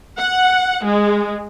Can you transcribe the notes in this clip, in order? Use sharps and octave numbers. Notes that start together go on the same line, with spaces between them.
F#5
G#3